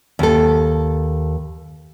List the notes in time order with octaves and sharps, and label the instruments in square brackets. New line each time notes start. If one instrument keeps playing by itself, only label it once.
[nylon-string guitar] D#2 A4